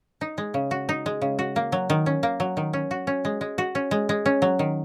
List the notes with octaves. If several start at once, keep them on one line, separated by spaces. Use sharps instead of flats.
D#4
G#3
C#3
F#4
D#4
G#3
C#3
F#4
A#3
F#3
D#3
C#4
A#3
F#3
D#3
C#4
F#4
C#4
G#3
G#3
F#4
C#4
G#3
G#3
C#4
F#3
D#3